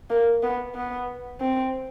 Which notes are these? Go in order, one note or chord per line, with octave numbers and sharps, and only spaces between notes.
A#3
B3
B3
C4